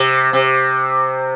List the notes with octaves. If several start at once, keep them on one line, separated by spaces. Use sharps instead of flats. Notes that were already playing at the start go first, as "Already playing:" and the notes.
Already playing: C3
C3